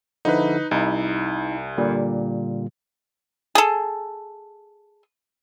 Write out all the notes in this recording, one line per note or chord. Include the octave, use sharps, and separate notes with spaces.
D3 F3 D#4 E4 B4
C2 D#4 E4
A#2 D3 G3
G#4 A4